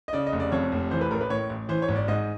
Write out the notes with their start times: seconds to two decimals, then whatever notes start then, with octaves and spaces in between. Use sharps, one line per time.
0.08 D#5
0.13 C#3 D5
0.27 D#5
0.32 F1
0.40 D5
0.52 F2 C#5
0.72 F1
0.91 E3 C5
1.01 B4
1.11 A1 A#4
1.21 B4
1.30 A2 C#5
1.50 A1
1.69 E3 C5
1.82 C#5
1.88 G#1
1.95 D5
2.08 G#2 D#5